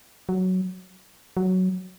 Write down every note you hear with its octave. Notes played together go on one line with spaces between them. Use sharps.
F#3
F#3